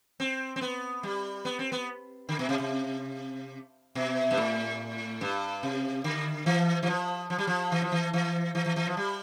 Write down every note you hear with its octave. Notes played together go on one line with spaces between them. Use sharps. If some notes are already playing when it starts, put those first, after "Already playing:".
C4
C4
B3
G3
B3
C4
B3
D3
B2
C3
C3
B2
G2
A2
G2
C3
D3
E3
E3
F3
F3
G3
F3
E3
F3
E3
E3
E3
E3
E3
F3
G3